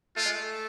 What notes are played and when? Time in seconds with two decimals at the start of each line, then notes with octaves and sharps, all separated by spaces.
0.16 A3 F4
0.26 G#3
0.35 A3